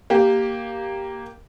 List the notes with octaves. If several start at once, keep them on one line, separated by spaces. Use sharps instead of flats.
A#3 G4